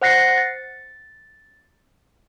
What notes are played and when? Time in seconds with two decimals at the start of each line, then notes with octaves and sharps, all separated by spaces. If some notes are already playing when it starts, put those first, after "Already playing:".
0.02 C5 F#5 F#6 A#6 C7 C#7
0.38 A6